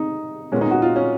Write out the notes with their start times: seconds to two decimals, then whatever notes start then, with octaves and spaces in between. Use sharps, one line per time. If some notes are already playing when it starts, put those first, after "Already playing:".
Already playing: D#4
0.52 A#2 G#3 B3 C#4
0.61 D#4
0.71 F#4
0.82 F4
0.96 C#4